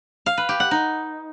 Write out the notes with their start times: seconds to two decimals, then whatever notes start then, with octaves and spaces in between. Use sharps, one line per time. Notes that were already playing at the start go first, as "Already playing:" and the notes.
0.26 F5
0.38 B4
0.49 G4
0.60 F#5
0.71 D#4